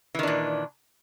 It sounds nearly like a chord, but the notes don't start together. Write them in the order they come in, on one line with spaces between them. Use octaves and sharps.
E3 D#3 D4 A#2